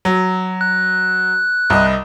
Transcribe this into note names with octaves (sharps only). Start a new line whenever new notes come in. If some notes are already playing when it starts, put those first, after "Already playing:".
F#3
F#6
C2 D#5